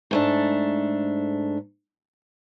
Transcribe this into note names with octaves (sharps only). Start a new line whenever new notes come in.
G#2 A3 D4